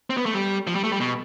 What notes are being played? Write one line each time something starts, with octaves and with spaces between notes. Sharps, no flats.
C4
B3
A3
G3
F3
G3
A3
G3
B2